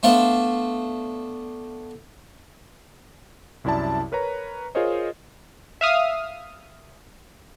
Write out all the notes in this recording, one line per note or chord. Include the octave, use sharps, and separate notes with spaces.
A3 B3 D4 C5 E5 F5
C2 F#2 E4 D5 A5
A#4 B4 C#5 A#5
F4 G#4 A#4 C5 C#5 D#5
E5 F5 D#6 F6